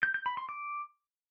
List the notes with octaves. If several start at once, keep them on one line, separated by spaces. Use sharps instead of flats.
G6
G6
B5
C6
D6